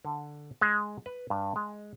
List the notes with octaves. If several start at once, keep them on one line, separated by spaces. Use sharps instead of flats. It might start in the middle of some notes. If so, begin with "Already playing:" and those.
D3
G#3
B4
G2
G#3